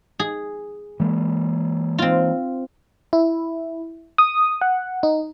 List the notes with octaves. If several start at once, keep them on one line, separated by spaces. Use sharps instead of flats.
G#4
E3 G#3 A#3
C4 F4
E4
D#6
F#5
D#4